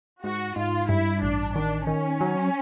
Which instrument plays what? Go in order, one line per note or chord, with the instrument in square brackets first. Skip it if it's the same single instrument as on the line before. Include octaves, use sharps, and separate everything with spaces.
[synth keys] G#2 [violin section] F#4
[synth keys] G#2 [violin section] F4
[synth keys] G2 [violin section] E4
[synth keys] A1 [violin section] D4
[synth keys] D#3 [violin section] D4
[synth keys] D#3 [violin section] C#4
[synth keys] F#3